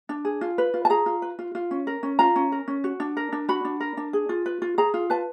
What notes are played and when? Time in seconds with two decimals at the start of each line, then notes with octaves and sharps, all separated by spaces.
0.09 D4
0.25 G#4
0.41 F4
0.58 B4
0.74 F4
0.85 A5
0.90 G#4 A#5
1.06 F4
1.22 B4
1.39 F4
1.55 F4
1.71 C#4
1.87 A#4
2.03 C#4
2.19 F4 A#5
2.36 C#4
2.52 A#4
2.68 C#4
2.84 F#4
3.00 D4
3.17 A#4
3.33 D4
3.49 F#4 B5
3.65 D4
3.80 A#4
3.97 D4
4.13 G#4
4.29 F4
4.46 B4
4.62 F4
4.78 G#4 A#5
4.94 F4
5.10 B4 A5